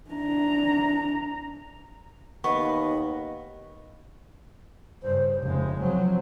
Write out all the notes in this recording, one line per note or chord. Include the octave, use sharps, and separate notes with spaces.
D4 A#5
D#2 B3 D#5 C#6
G2 C#3 C5
F1 C#3 G#3
F3 F#3 C4